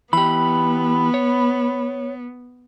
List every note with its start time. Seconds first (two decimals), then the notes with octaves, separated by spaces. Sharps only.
0.13 E3 B3 G4 B5
1.14 C#5